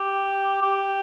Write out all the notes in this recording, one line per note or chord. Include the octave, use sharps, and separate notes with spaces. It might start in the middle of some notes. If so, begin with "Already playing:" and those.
Already playing: G4
G4